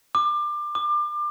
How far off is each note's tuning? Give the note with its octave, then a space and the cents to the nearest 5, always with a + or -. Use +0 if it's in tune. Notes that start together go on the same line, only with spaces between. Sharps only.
D6 +25
D6 +30